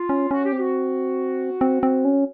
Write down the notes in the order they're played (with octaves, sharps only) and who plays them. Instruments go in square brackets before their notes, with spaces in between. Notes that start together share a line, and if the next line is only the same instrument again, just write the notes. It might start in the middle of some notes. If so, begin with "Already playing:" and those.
Already playing: [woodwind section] F4
[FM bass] C#4
[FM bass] C#4 [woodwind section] F#4
[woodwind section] G4
[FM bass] C4
[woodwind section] F#4
[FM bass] C4
C4
C#4